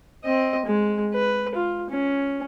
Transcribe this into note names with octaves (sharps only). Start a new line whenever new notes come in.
C4 D#5
G#3
B4
F4
C#4